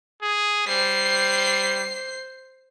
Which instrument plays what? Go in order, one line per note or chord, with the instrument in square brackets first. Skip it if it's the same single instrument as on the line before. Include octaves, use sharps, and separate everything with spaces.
[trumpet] G#4
[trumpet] G3 [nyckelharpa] C5 [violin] C7